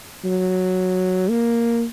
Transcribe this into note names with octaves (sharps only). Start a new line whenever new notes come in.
F#3
A#3